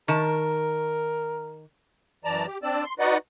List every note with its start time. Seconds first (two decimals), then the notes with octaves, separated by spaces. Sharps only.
0.08 D#3 A#4 A5
2.25 F#2 E3 D5 A5 A#5
2.46 G4
2.63 C4 D4 D5 E6
2.84 C6
2.99 D#4 F#4 B4 D5 D#5 F#5